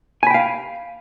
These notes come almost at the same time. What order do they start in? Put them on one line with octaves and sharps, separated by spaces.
G#5 B5 G5 F5